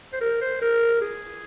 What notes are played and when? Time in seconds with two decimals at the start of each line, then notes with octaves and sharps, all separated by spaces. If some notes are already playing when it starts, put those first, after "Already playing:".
0.13 C5
0.21 A#4
0.41 C5
0.61 A#4
1.01 G#4